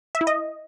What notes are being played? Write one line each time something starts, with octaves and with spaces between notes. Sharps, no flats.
E5
E4
D#5